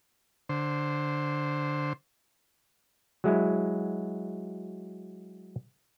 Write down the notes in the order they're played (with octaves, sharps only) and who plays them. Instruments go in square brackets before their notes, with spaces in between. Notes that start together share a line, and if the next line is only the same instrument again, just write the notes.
[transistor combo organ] D3 C5
[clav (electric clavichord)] F#3 G#3 E4